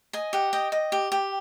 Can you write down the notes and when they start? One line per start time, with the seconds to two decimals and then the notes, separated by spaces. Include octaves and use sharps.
0.13 D#5 G#5
0.33 G4 F#5
0.53 D#5 G5
0.72 D#5
0.92 G4
1.12 G4